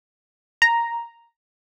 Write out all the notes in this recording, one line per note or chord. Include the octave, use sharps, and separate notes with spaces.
A#5